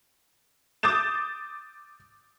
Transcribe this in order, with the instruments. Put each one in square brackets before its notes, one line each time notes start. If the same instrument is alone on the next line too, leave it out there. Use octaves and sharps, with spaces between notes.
[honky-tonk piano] D6 D#6 G6 A6 E7